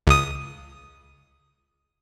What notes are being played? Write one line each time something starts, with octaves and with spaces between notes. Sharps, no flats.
C#2 D#6